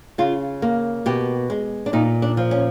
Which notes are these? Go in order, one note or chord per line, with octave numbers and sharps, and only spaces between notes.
C#3 F4
A#3
B2 G4
G#3
D4
A#2 D#4
D4
F3
C#4